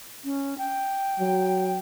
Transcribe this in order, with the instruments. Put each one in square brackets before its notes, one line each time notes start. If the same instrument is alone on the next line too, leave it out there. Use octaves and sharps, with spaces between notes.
[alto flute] C#4
G5
[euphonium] F#3